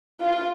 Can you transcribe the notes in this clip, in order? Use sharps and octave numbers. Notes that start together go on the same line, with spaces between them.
F4